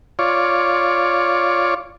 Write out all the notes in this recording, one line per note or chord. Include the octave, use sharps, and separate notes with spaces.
F4 C#5 D5